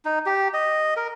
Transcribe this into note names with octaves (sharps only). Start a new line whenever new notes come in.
D#4
G4
D#5
A#4